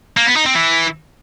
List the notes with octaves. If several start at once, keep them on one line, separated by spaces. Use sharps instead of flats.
A#3
B3
D#4
C4
E3